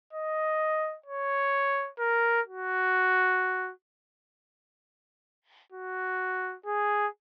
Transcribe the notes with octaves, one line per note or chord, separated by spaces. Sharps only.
D#5
C#5
A#4
F#4
F#4
G#4